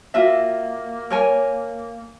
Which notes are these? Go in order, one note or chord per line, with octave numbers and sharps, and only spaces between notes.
A#3 F4 F#4 E5
A#4 C#5 G#5